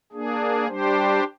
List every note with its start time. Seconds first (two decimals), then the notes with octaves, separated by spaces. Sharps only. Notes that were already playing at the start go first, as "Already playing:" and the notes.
0.12 A#3 D4 G#4
0.68 G3 D4 G4 C5